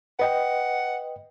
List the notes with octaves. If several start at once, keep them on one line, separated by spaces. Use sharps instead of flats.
B4 D#5 F#5 G5